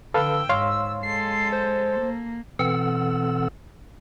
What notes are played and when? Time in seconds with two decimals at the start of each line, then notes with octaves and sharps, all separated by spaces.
0.14 D3 A4 B4 F5 G5 E6
0.49 G#2 C#5 F5 C6
1.03 G#3 A4 C7
1.52 C5
2.00 A#3
2.59 B2 E3 C4 A4 F#5 E6